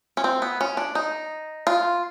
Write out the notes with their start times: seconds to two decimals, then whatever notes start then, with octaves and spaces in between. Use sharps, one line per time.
0.17 C#4
0.24 C4
0.42 B3
0.61 C#4
0.77 D4
0.95 D#4
1.67 F4